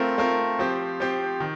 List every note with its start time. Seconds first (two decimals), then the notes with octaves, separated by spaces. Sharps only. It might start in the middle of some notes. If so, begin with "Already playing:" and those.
Already playing: A3 C4 F4 A#4
0.18 A3 C4 F4 A#4
0.59 F3 C4 G4
1.00 F3 C4 G4
1.40 D#3